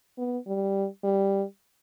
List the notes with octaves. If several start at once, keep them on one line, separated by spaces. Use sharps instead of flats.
B3
G3
G3